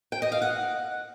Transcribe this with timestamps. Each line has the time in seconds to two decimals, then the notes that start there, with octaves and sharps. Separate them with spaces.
0.12 G5
0.22 D#5
0.32 F5
0.42 F#5